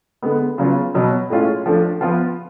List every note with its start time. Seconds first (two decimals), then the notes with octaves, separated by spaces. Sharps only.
0.22 D3 G#3 B3
0.58 C#3 F#3 B3 F4
0.94 B2 F#3 B3
1.30 A2 G#3 C#4 F4
1.66 F3 A3 D4
2.01 F3 B3 F4